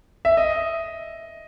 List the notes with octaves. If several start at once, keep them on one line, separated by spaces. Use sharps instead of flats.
E5
D#5